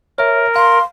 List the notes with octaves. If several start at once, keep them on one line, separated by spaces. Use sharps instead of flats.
A#4 C#5 E5
F5 C6